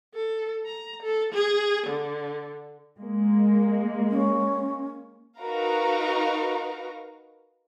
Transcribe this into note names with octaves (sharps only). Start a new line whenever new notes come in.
A4
A#5
A4
G#4
D3
G#3 A#3
C#4
D#4 F#4 A#4 B4 F5 A#5